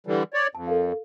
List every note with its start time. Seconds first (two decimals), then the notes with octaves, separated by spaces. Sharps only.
0.07 D3 E3 G3
0.34 C#5 D5
0.55 F2 A5
0.67 A4 A#4 F5